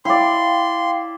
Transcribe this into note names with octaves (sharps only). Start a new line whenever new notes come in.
E4 D5 F5 G5 C6